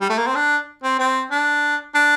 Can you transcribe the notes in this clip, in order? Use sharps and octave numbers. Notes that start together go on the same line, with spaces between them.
G3
A3
A#3
C4
D4
C4
C4
D4
D4